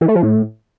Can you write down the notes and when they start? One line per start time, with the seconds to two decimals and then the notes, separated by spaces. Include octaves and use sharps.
0.01 E3
0.08 A3
0.15 F3
0.23 A2